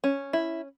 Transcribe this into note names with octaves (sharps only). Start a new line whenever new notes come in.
C#4
E4